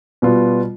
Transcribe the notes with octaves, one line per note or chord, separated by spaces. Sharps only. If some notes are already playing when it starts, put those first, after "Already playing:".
B2 G3 B3 F4